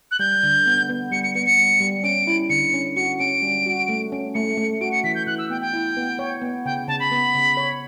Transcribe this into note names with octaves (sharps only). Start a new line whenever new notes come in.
F#6
G3 G6
D3
B3
B3
G3 C#7
C#7
B3 C#7
C#7
G3
G3
C#4 D7
E4
D3 C#7
C#4
F#4 C#7
C#4 D7
G3
F#4
A3
C#4
A3 C#7
A3
F#4 D7
C#7
E3 B6
G6
E3 F#6
E6
B3 G5
G5
E4
B3
C#5
B3
C#3 G5
C#3 A5
B5
B3
C#3
C#5